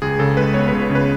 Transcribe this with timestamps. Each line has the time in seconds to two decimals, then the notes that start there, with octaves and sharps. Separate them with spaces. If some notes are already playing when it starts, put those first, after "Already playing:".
0.02 C#2 G#4
0.19 C#3 A4
0.37 G#3 B4
0.54 B3 C#5
0.68 B4
0.72 C#2
0.81 B4
0.90 C#3
0.95 B4